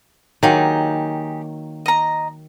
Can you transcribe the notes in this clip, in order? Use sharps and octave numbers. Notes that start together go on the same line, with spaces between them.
D#3 F#3 A#3 D#4 G4 G#4
D#5 A#5